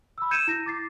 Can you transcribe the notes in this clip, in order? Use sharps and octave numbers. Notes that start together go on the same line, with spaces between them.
B5 E6
E6 G6 G#6 C#7 D#7 E7
E4 A#6
D6 A6 C7